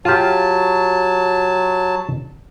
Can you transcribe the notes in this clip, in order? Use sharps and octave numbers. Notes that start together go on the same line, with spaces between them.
F#3 F4 G4 A5